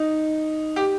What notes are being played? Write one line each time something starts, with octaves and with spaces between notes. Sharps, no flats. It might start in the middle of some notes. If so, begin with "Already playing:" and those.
Already playing: D#4
G4